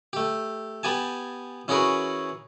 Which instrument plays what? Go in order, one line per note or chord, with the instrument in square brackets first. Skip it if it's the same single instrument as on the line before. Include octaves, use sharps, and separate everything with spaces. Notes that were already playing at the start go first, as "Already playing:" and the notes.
[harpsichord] A3 G4
B3 G4 G#5 A5
E3 C#4 F#4 G#4 A#4 B4